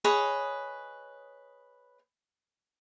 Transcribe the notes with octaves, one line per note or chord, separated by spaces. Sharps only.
G#4 B4 C#5 D#5